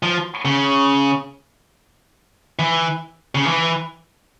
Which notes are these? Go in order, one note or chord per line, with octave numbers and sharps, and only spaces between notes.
F3
C#3
E3
C#3
E3